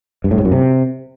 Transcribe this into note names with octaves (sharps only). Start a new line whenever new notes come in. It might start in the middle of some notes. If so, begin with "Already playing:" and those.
G2
A2
G#2
F#2
C3